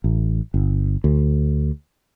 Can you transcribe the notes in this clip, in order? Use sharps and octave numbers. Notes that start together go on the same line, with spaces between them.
A1
G1
D2